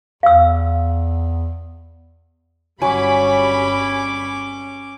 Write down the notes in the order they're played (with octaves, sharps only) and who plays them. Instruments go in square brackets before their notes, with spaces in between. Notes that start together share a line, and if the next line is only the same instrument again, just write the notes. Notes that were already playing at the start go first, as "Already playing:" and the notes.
[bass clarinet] E2 [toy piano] F5 E6
[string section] G1 G3 B5 [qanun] F#3 [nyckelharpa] C#4 D6 [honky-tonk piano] G#5 C#6